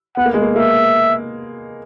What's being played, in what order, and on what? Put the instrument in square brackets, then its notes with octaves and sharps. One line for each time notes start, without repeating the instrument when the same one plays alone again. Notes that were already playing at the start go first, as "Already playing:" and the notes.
[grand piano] B3 [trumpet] F#5
[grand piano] A#3
G#3
A#3
[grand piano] A#3 [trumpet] E5